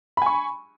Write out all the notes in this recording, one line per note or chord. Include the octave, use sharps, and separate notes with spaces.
G#5 B5 C#6